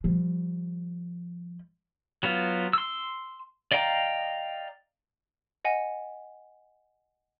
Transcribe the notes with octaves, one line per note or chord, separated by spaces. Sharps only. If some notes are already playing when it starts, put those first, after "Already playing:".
F3 G3
F#3 B3 F4
C6 E6
D5 D#5 F5 G5 A#5
D#5 F#5 G#5